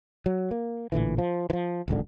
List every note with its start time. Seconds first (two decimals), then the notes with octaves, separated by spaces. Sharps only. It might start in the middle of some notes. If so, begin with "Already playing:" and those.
0.26 F#3
0.51 A#3
0.92 A1 A#2 D3 E3
1.18 F3
1.50 E3 F3
1.88 D1 G#1 C#2 D3